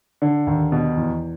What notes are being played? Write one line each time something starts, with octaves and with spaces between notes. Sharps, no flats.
D3
D#2
B2
E2